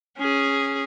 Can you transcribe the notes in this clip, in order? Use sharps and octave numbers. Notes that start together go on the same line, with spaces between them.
C#4 G#4